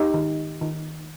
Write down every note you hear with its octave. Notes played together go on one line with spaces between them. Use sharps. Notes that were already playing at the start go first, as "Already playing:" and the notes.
Already playing: D#4 G4
D#3
D#3